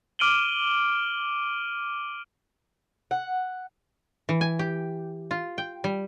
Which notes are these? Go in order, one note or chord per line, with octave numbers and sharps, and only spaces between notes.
D6 F6 D7 D#7 F#7 G7
F#5
E3
G#5
G4
F4
G5
G3